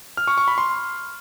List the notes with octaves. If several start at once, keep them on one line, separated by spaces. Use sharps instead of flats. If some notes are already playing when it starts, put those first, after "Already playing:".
F6
C#6
C#6
B5
C6